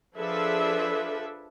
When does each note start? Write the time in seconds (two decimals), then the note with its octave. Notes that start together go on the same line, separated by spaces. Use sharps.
0.17 F3 D4 G#4 A4 B4 E5